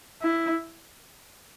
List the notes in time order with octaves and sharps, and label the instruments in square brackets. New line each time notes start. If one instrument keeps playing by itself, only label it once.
[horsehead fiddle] E4